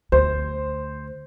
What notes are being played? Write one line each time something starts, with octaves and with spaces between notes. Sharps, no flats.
D2 C5